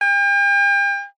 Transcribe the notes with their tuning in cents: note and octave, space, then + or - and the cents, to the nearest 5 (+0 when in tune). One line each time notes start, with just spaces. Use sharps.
G5 +40